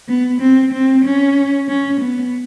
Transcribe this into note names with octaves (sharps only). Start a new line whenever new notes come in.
B3
C4
C4
C#4
C#4
B3